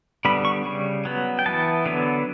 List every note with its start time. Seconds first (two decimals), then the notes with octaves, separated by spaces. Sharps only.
0.25 D3 G3 B3 B5
0.45 C#6
0.65 C#3 G3
1.05 F#3 B3
1.39 G5
1.46 E3 B3 A5
1.86 D3 F#3 B3